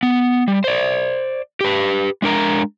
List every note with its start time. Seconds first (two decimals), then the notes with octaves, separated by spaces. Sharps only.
0.03 B3
0.48 G3
0.64 C5 D5
1.61 G4 B4
2.22 G#3 D4 A#4 A#5